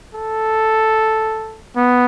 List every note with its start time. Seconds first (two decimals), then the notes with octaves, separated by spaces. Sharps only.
0.15 A4
1.77 B3